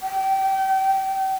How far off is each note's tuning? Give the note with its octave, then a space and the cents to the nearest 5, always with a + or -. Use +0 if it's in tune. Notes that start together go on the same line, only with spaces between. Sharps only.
G5 -25